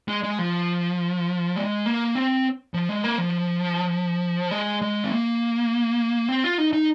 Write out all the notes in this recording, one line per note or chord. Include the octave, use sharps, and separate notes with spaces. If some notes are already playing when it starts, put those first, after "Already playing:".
G#3
G#3
F3
G#3
A#3
C4
F3
G#3
A#3
F3
G#3
G#3
C4
A#3
C4
F4
D#4
D#4